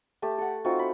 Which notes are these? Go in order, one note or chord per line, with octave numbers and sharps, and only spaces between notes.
A3 G4 A5
A4 F#5
C4 D#4 F4 F#4
B5